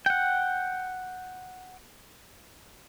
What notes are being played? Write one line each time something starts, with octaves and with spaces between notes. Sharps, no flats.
F#5 G5